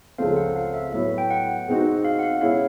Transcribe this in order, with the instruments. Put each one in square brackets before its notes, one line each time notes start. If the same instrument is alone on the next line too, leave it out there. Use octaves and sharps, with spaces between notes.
[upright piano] C#2 C#3 F3 A3 C4 [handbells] F5
[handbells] F#5
F5
E5
[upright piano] A2 F#3 B3 [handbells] E5
[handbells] G5
F#5
[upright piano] B2 G#3 C4 D#4 F#4
[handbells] F5
F#5
F5
[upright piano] B2 G#3 C#4 E4 [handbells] F5